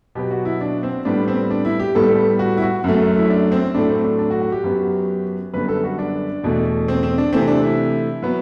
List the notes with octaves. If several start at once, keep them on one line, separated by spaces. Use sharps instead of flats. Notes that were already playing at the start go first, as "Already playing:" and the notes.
B2 F#3 B3 G4
F#4
E4
D4
C4
A2 G3 B3 D4
C4
D4
E4
G4
A2 G3 B3 A4
F#4
E4
F#4
F#2 F#3 A3
E4
D4
C4
A2 F#3 A3 D4
C4
D4
D4
F#4
F#4
G4
F#2 F#3 B3
F#2 D3 G3 B3 B4
A4
F#4
D4
E2 B2 A3
C4
C4
D4
C3 E3 A3 C4
D4
E4
F#3 B3